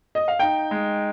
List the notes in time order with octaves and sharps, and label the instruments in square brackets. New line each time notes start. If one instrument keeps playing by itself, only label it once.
[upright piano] D#5
F5
[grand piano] D#4 [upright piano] G5
[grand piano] G#3